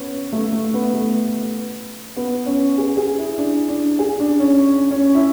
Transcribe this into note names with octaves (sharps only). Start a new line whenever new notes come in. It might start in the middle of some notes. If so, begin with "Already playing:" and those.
Already playing: B3 C#4
A3
A3
B3
A3
B3
C#4
G#4
G#4
E4
D4
D4
G#4
D4
C#4
C#4
E4